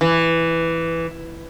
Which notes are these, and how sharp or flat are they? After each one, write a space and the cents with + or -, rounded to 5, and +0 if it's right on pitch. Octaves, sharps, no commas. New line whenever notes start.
E3 +5